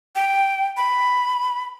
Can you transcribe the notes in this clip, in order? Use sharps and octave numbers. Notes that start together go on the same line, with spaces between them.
G5
B5